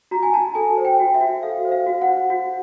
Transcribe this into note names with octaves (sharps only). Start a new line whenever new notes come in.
F#4 A#5
G#5
F#4 A5
A4 G#5
C5
G5
F#4
E5
F#4
A4 F5
C5
F5
F#4
F#5
F#4
F#4